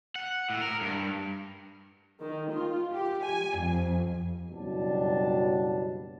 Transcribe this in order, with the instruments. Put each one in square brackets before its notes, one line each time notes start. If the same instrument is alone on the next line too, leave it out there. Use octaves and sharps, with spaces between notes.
[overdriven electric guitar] F#5
A2
A#4
G2
[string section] D#3
F4
G4
G#5
F2
[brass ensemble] F#1 B2 F#3 G3 D4 A5